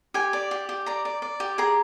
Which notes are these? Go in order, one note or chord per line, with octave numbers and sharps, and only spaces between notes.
G4 G#5
D5
G4
G4
D5 A#5
D5
D5
G4
G#4 A#5